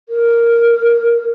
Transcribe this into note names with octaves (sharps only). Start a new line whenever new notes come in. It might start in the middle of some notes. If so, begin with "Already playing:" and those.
A#4